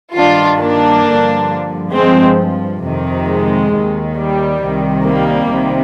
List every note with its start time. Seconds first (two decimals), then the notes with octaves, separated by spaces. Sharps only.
0.15 G2 D#3 D4 F4
0.60 A#3 D4
1.05 G2 D3 F3
1.94 G2 F3 G#3 C4
2.83 F2 C3 D#3
3.27 G#3
3.71 D#2 D#3
4.16 G3
4.60 C2 C3 D#3
5.04 G3 A#3
5.49 C2 C3 D#3